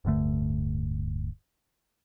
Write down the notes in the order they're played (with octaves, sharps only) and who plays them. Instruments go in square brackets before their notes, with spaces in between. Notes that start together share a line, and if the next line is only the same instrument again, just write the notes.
[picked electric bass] D1 G2 D3 A3